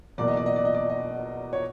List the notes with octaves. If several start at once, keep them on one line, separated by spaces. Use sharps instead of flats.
E2 B2 F#3 A#3 D5
D#5
D5
D#5
D5
D#5
D5
D#5
C#5